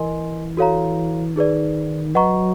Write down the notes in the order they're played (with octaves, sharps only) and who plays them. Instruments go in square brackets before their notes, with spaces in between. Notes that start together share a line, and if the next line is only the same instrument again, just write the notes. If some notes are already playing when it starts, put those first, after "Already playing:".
Already playing: [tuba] E3 [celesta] A#4 D#5 G#5 C6
[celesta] F#4 A4 C#5 F5 A#5
[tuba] D#3 [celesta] D#4 G#4 B4 D5
[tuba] F#3 [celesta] B4 D#5 F#5 A#5 C#6